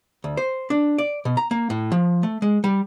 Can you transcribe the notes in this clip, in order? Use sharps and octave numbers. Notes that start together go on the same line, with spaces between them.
D2
C5
D4
D5
B2
A#5
A#3
A2
F3
A3
G#3
G3